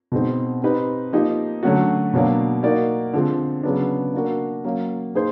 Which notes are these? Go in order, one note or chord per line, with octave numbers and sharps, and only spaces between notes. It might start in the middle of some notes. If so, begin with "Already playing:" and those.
B2 G#3 C4 D#4
C4 D#4 G4 B4
F3 A#3 D#4 G4
D3 F#3 A3 C#4 F#4
B2 F#3 A#3 D4
A#3 D#4 F#4 A#4 D5
D3 F3 G#3 C4
C#3 F#3 B3 D4
A#3 D4 F#4 A#4
F#3 A#3 C#4
A#3 D#4 G#4 C5